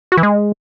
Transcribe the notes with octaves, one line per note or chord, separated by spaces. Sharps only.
F#4
E3
G#3